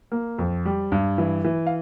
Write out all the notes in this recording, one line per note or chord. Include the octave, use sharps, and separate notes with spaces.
A#3
F2
G3
G2
E3
E3
F5